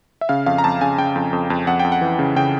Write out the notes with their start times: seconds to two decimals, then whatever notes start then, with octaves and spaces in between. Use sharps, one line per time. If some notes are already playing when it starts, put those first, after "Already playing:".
0.21 E5
0.29 C#3 F5
0.46 F2 F5
0.58 A#5
0.64 F2 A5
0.81 C#3 G#5
0.98 C#3 G5
1.16 F2
1.33 F2
1.50 F2
1.67 F2 F#5
1.79 F2 G5
1.92 F#5
2.01 E3
2.19 C#3
2.36 C#3 G5